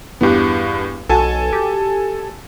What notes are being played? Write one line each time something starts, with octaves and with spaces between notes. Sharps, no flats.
E2 G2 B3 G4 F#6
B1 F#4 A4 G#5 A5
G4